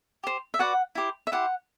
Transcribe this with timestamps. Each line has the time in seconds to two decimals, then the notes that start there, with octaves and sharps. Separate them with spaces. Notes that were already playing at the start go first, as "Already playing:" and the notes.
0.24 G4 C5
0.54 E5
0.59 F#4 B4 D5 F#5
0.95 E4 G4 C5
1.27 E5
1.32 E4 G4 C5 F#5